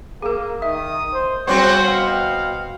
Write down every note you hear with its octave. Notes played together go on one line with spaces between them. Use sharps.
A#3 G#4 A#4
D#3 E5 D#6
C5
C#3 G3 B3 C4 F#4 C5 C#6
B2 F5